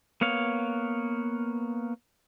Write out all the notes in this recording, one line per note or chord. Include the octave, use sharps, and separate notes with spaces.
A#3 B3 C#5 F5